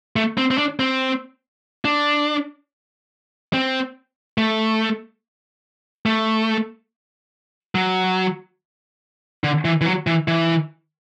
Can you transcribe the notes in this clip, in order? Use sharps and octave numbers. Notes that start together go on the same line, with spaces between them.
A3
C4
C4
D4
C4
D4
C4
A3
A3
F#3
D3
E3
E3
F#3
E3
E3